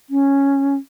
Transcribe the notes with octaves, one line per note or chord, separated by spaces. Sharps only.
C#4